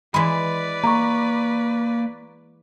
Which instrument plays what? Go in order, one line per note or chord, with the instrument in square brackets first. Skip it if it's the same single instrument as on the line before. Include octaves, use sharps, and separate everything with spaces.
[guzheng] E3 G#3 [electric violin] B4 D5 [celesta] B5
[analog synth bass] A#3 [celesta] A#5 C#6